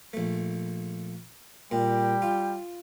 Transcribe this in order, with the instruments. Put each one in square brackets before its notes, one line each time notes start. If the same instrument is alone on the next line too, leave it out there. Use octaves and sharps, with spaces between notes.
[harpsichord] A#1 A3
[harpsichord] A#2 [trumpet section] G3 G5
[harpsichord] F4